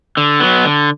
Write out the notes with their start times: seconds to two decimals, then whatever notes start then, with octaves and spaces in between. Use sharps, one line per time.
0.17 D3
0.40 F#3 B3
0.65 D3